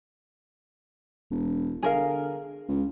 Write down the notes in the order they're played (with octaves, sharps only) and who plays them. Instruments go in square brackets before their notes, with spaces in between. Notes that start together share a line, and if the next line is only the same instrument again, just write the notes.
[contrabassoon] E1
[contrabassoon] D3 [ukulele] G#4 A#4 F5
[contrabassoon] C#2